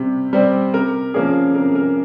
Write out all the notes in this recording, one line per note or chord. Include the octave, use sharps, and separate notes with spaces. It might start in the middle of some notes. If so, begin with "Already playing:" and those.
Already playing: C3 G3
G3 C4
C3 A#4
F3 A#3 C#4 G#4
C3 A#4
A#4